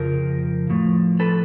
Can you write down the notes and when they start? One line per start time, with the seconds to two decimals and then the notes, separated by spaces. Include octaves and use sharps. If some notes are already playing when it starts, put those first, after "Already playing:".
Already playing: F2 C#3 F3 A#4
0.70 A2 F3
1.20 A4 B4